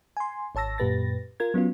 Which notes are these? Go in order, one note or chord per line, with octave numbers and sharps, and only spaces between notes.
G#5 C6
G#1 C#5 A5 E6 A#6
F#2 A#2 G4 B4 A6 A#6
F4 A#4 G#6
F#3 B3 C#4 F4